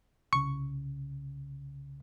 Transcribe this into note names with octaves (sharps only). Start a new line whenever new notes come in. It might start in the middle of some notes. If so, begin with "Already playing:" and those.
C2 C#3 C#6